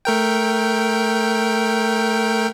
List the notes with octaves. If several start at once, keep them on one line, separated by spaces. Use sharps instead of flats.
A3 A#4 G5